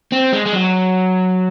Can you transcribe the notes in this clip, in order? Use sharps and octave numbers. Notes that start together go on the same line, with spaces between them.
C4
G#3
G#3
F#3